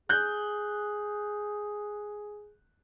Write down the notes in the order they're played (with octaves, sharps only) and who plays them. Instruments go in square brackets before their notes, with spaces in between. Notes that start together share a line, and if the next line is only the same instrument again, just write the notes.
[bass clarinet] G#4 [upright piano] F#6 G6